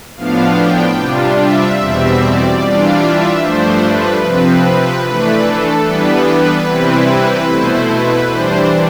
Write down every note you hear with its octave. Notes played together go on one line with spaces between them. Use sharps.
A2 F3 B3 D4 F5
G5
C3 G3 D4 F4
E5
E2 B2 G3 C4
D5
E3 G3 D4 F4
E5
G2 F3 A3 D4 C5
B4
C3 F3 C4 B4
B4
E3 A3 D4 B4
A4
E3 G3 B3 D4 B4
C3 E3 G3 C4 E4
B2 A3 E4 C5
B4
E3 G3 D4 C5